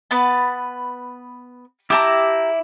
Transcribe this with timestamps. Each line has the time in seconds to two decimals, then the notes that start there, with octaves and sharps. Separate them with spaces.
0.11 B3 B4 A5
1.90 E4 G4 A5 A#5 D6